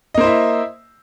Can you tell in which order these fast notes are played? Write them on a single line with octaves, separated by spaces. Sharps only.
D#5 A#3 C5 E4 E5